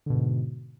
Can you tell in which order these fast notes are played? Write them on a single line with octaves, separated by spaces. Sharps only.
D3 B2 G#2